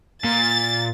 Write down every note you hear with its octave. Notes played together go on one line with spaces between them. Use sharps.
A#2 A6